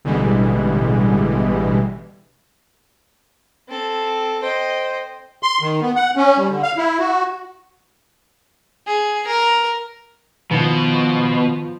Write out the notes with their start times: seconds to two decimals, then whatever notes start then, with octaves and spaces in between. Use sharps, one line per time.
0.05 A1 B2 D3 E3 G3 G#3
3.68 C4 A4
4.43 C5 D#5 G5
5.43 C6
5.61 D#3
5.82 B3
5.96 F#5
6.16 C#4
6.38 G3
6.49 D3
6.63 F5
6.77 E4
6.99 F#4
8.87 G#4
9.27 A#4
10.51 B2 D#3 F3